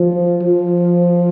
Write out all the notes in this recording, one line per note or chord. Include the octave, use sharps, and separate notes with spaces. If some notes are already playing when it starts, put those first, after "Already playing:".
Already playing: F3
F3